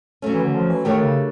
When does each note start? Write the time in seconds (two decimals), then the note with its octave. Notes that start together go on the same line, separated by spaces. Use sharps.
0.22 F#3 A3 C#4
0.34 E3
0.44 D3
0.54 F3
0.69 E3
0.85 D#3 A3 D4 G4 A#4 C#5
1.01 C#3